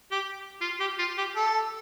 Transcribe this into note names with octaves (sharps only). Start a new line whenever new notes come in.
G4
F4
G4
F4
G4
A4